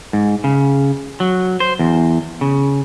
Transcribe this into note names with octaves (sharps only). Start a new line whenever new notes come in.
G#2
C#3
F#3
C5
E2
C#3